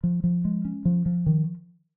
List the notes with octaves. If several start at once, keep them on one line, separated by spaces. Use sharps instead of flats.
F3
F3
G#3
C#4
F3
F3
D#3